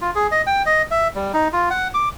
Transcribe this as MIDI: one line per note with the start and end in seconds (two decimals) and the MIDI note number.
0.01 0.11 65
0.15 0.27 68
0.31 0.42 75
0.47 0.62 79
0.66 0.82 75
0.91 1.08 76
1.15 1.32 55
1.34 1.48 63
1.53 1.69 65
1.70 1.88 78
1.94 2.09 86